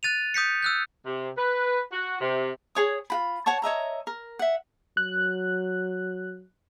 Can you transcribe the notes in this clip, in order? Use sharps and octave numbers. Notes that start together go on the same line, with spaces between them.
F#6 A6 D#7 F7
D#6 G6 B6 C#7
E6 F#6 G6
C3
B4
F#4
C3
G#4 C#5 D#6
F4 F#4 B5
C#5 F#5 A5 C#6
C#5 D#5 E5 A#5
A#4
E5 F#5
F#3 F#6